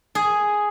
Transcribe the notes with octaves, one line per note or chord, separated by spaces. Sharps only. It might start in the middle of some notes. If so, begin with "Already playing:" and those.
G#4